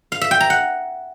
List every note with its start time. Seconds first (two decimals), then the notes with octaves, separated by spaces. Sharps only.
0.12 F5
0.21 E5
0.31 G5
0.40 A#5
0.50 F#5